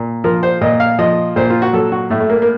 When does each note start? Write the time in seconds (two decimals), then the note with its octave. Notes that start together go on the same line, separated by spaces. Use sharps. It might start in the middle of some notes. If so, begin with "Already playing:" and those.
Already playing: A#2
0.24 F3 A#4
0.43 C5
0.61 A#2 D#5
0.80 F5
0.99 F3 D#5
1.36 A#2 C5
1.50 F4
1.62 F#4
1.73 F#3 A4
1.92 F#4
2.10 A2 A3
2.20 A3
2.30 A#3
2.42 A#3